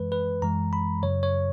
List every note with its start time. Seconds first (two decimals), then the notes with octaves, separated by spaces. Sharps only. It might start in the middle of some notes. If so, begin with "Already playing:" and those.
Already playing: F#2 E3 G#3 B4
0.12 B4
0.42 F#2 E3 G#3 A#5
0.73 B5
1.03 F#2 C#3 F#3 C#5
1.23 C#5